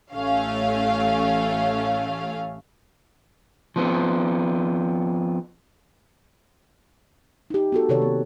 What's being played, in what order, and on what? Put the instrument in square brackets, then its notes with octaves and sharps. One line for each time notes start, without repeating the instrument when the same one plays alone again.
[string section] A1 A3 C#4 F5
[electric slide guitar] F3 B3 C4
[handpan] D#4 G4
B3 F#4 A4
C3 D#3 A4 B4 C#5 D5
A#3